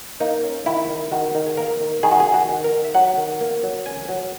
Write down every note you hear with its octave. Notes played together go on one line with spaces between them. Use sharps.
A#3 D#4
C#4
D#3 E4
D#3
D#3 F#4
D#3
G#4
A#3 A#4
D#3
D#3 G#4
F#4
G#4
D#3
F#4
D#3
A#4
D#3
E5
F#3 F#5
D#3
A#3
F#3
C#4 G#5
F#3